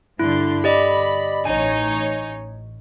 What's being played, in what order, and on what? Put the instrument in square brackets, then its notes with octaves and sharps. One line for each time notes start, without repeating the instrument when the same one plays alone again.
[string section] G2 D3 C6 [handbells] E4
[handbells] G4 D5 D#5 [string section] B5
[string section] A1 D#4 C#5 [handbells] G#5